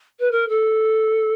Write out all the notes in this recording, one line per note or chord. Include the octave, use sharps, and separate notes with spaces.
B4
A#4
A4